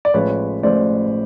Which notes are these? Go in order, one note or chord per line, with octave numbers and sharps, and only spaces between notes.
D5
A1 A2 F3 G#3 B4 C#5
A1 A2 F3 G#3 C5 D5